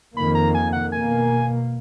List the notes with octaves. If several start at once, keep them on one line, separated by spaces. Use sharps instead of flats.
F2 D#3 A#3 B5
A#5
G#5
F#5
B2 A#3 G#5